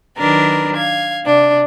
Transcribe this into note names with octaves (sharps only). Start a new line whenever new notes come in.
D#3 F#3 D4 A#4 B4
F5 G#6
C3 D4